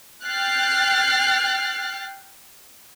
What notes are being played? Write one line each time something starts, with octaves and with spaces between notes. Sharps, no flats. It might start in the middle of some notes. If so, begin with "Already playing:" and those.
G5 F6 F#6 A6 C7